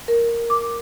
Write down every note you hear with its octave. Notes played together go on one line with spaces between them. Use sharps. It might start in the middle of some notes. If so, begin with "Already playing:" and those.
A#4
D6